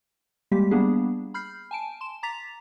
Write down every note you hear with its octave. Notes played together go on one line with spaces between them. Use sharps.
G3 G#3 A#3 G4 B6
G3 A#3 B3 D4 G#4
B5 F6 G6 C7
G#5 A5 D7
C6 E7
A#5 D6 A6 B6 F7